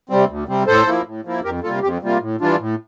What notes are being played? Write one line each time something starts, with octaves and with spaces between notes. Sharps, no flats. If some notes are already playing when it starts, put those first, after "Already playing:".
C3 G3 C4
D2
C3 G3 C4
A2 A4 C5
F3 A#3 E4
A2
F3 A#3 E4
F2 G4 A#4
C3 G3 A#3 F4 A4
F2 G4
C3 G3 A#3 F4
A2
E3 G3 D4 F4
A2